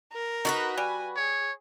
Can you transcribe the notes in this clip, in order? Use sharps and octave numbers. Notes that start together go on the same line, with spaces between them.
A#4
D#4 F#4 A4 B4
G3 G#5
G#4 C#5